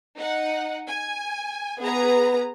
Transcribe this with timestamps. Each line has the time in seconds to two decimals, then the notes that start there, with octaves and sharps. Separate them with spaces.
0.17 D#4 F#5
0.88 G#5
1.80 B3 G#4 B4 A#5